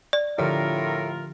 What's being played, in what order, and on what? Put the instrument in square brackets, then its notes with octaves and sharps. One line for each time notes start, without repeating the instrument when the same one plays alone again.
[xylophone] D5
[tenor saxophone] A2 [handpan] D3 F3 G4 [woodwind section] F4 A#4